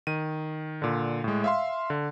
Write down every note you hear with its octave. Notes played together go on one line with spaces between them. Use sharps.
D#3 D#7
A#2 D3
A2 G#3
E5 F5 C6
D3